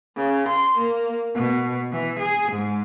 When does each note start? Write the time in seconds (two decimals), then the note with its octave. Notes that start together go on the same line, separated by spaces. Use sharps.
0.17 C#3
0.48 C6
0.78 A#3
1.35 B2
1.92 E3
2.20 G#4
2.53 G#2